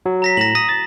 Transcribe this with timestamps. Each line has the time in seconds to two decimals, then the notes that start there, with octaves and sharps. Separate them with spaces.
0.06 F#3
0.22 A#5 A#6 B6
0.37 A2 A#6 E7 F#7
0.55 D#6 A#6
0.69 A6